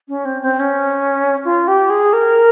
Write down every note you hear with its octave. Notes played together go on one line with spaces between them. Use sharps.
C#4
C4
C4
C#4
F4
G4
G#4
A#4